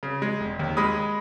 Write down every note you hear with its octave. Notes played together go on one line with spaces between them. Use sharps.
C#3
G#3
E1
D#2
G#3 B5 D#6